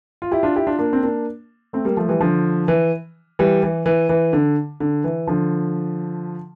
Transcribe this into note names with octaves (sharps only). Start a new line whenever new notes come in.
F4
E4 G4
D4 F4
E4 G4
D4 F4
A#3 D4
C4
A#3 D4
A3 C4
G3 A#3
F3 A3
E3 G3
D3 F3
E3
E3 G3
E3
E3
E3
D3
D3
E3
D3 F3